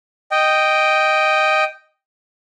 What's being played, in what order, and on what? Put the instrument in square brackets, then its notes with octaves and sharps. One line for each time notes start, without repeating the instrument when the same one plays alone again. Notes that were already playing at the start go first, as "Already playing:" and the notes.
[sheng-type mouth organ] D#5 G5